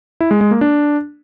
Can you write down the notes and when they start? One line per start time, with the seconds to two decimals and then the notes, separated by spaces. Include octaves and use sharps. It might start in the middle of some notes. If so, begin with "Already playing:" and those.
0.21 E4
0.31 G#3
0.41 G#3
0.51 A#3
0.61 D4